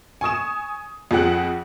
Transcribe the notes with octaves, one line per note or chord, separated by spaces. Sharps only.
G#5 C#6 D#6 E7
F2 F3 G#4 F#5 F#6